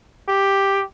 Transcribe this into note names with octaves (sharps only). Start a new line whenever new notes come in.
G4